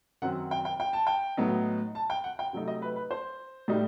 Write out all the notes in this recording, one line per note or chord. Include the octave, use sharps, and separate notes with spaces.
F#2 D#3 F#3 C4 F#5
G5
G5
G5
A5
G5
A2 F#3 B3 D#4
A5
G5
F#5
G5
C3 F#3 A3 D#4
D#5
B4
B4
C5
A2 G3 D#4